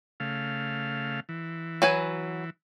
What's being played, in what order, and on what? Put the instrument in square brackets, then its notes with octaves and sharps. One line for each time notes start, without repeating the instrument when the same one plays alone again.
[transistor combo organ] C#3 A3 F5
E3
[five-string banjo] F#3 B4 G#5